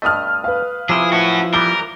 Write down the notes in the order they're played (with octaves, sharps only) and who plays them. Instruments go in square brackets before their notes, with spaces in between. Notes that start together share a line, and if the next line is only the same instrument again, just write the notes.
[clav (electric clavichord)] G2 B2 A3 [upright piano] D#5 D#6 F6
[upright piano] B4 F5
[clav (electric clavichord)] C3 G5 [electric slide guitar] F3 E4 [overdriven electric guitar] G#4
[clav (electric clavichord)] A2 [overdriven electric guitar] C#4 F#4
[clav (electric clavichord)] E3 G3 B3 [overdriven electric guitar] A#4 [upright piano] G7